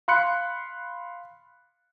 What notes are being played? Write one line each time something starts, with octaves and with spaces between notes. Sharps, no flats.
F5 B5 C6 F#6 C#7